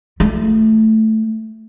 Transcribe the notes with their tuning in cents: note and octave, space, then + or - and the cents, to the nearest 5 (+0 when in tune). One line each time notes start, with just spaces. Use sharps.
A3 +0 F4 +30